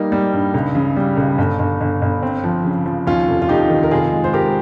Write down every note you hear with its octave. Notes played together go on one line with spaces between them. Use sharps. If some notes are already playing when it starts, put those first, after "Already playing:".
Already playing: G3 A#3 D#4
G3
G2
C#2
C#3
G3
C#2
G1
G1
G1
G1
C4
F3
C#3
F3
D#2 C#4 F4
F1
F4
F1 D#4 G4
D#3
A#4
F1 F4 G#4
G#3
C5
G#3 G4 A#4